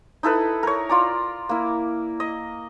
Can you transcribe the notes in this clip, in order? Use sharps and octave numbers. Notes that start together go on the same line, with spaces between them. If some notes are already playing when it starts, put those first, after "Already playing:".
D#4 E4 A4 B4
A#4 C#5
F4 D5 A#5
A#3 E4
D#5